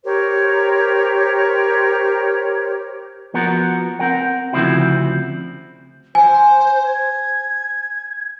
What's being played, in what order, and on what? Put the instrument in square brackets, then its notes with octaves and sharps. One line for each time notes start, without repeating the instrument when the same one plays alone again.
[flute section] G4 A#4 C5 C#5
[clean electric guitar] F3 B3 F#4 A#4
C4 A#4 F#5
D2 C#3 F3 C4 E4 F#4
[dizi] C5 [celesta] G#5
[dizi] G#6